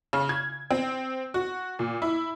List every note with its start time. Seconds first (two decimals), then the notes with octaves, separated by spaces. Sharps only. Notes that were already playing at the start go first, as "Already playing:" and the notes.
0.13 C#3
0.29 G#6
0.71 C4
1.34 F#4
1.79 A#2
2.02 E4